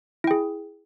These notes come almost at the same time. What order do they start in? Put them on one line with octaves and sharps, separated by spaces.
E4 G5 G#4